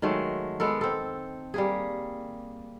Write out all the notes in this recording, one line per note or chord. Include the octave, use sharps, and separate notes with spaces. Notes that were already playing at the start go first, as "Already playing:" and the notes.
D#3 F#3 G#3 A3
G#3 B3 A4 A#4
C4 A4
G3 A#3 G#4